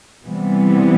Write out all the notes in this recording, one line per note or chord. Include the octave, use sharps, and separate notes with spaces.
C3 E3 G3 B3